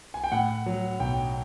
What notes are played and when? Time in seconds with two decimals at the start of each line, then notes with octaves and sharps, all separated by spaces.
0.14 G#5
0.24 G5
0.32 A2 F#5
0.66 F#3
1.00 B1 G5